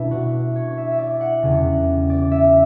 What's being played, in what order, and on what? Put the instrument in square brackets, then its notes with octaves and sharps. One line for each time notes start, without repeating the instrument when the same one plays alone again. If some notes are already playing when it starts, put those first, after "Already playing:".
Already playing: [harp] B2 D4 E4 B4
F#4
C#5
E5
E5
D5
F#5
E2 C#3 G3
D5
E5